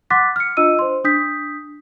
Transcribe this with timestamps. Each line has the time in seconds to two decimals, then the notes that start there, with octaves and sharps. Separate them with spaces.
0.10 F#5 C6 D6 F#6 A6 B6
0.36 F6 C#7
0.57 D4 F4 D#5 E6 D#7
0.79 C5 C6
1.04 D4 D#6 G6 B6